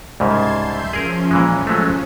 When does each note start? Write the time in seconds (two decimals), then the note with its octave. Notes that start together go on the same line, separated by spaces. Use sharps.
0.20 C2 G#2 C#3 A5 C6 G#6
0.61 E5 C6 G6
0.93 F3 C#4 G#4 A#4
1.31 A#2 E3 G#3
1.67 F#3 G#3 A3